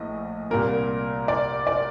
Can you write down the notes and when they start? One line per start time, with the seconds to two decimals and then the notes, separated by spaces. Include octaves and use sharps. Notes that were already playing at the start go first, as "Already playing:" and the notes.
Already playing: A#1 A2 D#5
0.50 C2 A#2 G3 A#3 A#4
1.28 D5
1.67 D5